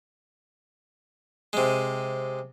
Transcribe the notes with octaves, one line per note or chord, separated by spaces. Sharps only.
C3 G#3